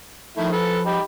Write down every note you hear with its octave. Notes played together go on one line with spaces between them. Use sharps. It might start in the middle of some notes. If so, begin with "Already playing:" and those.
D#3 F3 A3 E4
A4 B4
D#4 G4 B5